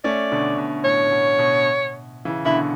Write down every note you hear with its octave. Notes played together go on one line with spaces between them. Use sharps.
A3 C#4 D5
B2 D3
B2
A2 C#5
A2
B2
B2 D3
C#3 E3
B2 D3 E4